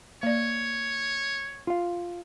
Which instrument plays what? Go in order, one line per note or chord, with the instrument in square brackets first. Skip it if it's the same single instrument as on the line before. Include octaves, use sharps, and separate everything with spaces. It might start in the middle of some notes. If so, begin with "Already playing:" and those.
[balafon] A#3 D5 [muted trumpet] C#5
[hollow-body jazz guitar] F4 F5